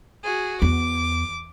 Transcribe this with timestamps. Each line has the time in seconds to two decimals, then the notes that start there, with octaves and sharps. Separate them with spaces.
0.23 F#4 G#4
0.62 E2 D6